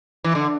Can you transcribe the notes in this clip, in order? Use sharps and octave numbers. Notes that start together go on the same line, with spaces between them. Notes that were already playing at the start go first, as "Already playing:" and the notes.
E3
D3